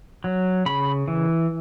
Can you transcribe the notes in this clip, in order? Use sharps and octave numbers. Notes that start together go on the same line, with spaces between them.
F#3
C#3 B5
E3